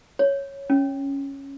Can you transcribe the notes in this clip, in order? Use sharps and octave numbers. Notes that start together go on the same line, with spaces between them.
C#5
C#4